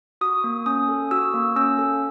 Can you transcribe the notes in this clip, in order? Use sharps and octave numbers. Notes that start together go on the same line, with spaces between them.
F#4 D#6
A#3
C#4 D#6
A4
F#4 E6
A#3
C#4 E6
A4